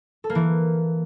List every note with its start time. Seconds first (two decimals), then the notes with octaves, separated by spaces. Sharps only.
0.24 A4
0.30 A#3
0.35 E3